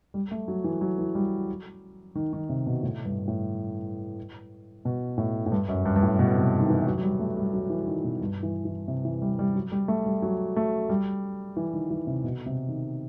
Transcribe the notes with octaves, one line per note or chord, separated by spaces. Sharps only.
G3
A3
F#3
E3
F#3
E3
G3
D#3
D#3
C3
B2
A2
G2
A2
B2
A2
A2
G2
F#2
G2
G2
A2
B2
C3
D#3
E3
F#3
F#3
G3
A3
G3
F#3
E3
D#3
B2
G2
E3
E3
C3
E3
G3
G3
F#3
G3
A3
G3
F#3
A3
G3
E3
D#3
E3
C3
B2
C3
D#3